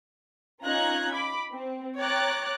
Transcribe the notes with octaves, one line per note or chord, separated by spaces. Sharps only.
C#4 D#4 F4 A#5 F#6 G#6
B5 D6
C4
C#5 G5 A#5 D6 F#6 A6